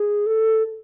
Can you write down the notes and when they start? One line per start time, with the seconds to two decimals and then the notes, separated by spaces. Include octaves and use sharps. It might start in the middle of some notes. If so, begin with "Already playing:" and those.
Already playing: G#4
0.26 A4